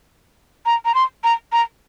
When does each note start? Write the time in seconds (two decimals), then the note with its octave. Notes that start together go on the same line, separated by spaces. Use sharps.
0.66 A#5
0.85 A#5
0.95 C6
1.24 A#5
1.53 A#5